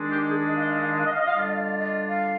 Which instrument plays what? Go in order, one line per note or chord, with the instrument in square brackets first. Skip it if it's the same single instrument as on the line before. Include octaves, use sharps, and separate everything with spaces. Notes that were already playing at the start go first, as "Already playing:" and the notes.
Already playing: [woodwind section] D#3 G#3 D4
G4
G#4
D#5
F5
D#5
F5
D#5
F5
D#5
F5
D#5
F5
D#5
F5
D#5
D3 G3 D4 F4 F5
D#5
F5
D#5
F5
D#5
F5